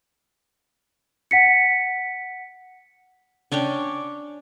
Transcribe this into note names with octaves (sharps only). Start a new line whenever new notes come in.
F#5 B6 C#7
C#4 D4 C#5 G5